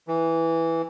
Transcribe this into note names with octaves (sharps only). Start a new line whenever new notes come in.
E3